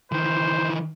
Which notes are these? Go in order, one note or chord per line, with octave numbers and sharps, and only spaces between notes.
D#3 E3 C5